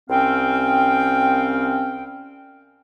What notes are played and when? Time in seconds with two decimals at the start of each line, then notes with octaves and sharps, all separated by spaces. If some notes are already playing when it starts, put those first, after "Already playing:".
0.10 C2 C4 C#4 F5 G5